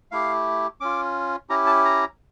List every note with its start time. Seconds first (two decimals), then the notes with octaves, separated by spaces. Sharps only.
0.12 A3 E4 G4 F5
0.81 C#4 F4 D6
1.50 C#4 E4 G4 A#5
1.66 A5
1.85 A#5